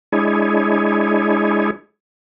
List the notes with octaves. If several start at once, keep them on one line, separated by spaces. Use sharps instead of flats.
G#3 D4 E4 G#4 C#5